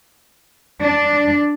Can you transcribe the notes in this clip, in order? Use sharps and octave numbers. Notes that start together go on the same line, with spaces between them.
D4